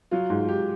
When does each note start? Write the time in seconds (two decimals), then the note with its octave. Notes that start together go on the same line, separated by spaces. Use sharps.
0.11 F#3 F4
0.30 G#2
0.48 G#2 G4